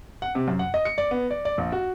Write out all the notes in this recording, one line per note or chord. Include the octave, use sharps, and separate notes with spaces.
F#5
C3
F#2
F#5
D#5
C#7
D5
B3
D5
D5
A#1
F#4